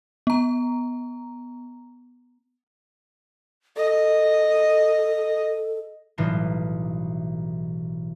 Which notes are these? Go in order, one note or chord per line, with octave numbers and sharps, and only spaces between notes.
B3 A#5
A4 D#5
B1 A2 E3 G3 D#4 F4